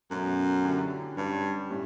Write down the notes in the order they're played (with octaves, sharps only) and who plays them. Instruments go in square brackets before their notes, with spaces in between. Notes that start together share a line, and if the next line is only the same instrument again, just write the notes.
[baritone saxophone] F#2 [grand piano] B2 A3 C#4 F#4
[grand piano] D3 F#3 C#4 E4 G4
[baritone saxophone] G2 [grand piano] G3 C#4 G4
[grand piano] A2 G3 C#4